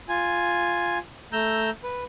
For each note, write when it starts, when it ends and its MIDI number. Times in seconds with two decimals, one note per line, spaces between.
0.09 0.98 65
0.09 0.98 80
1.33 1.70 57
1.33 1.70 82
1.33 1.70 88
1.33 1.70 91
1.84 2.04 71